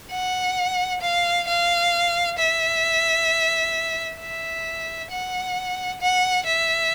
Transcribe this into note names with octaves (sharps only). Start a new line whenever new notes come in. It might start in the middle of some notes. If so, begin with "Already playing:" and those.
F#5
F5
F5
E5
E5
F#5
F#5
E5